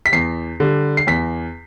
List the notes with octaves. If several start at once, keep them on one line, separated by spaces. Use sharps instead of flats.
B6
E2 C7
D3 G3
C7
E2 B6